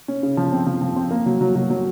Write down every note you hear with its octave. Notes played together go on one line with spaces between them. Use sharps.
C#4
C#3
F3
C4
F3
F3
C4
A#3
F#3
F#3
F#3
F#3